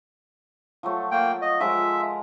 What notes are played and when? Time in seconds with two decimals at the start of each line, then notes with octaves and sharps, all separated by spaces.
0.83 F3 F#3 A3
1.11 A#3 G5
1.42 D#5
1.60 F3 G#3 A#4 E5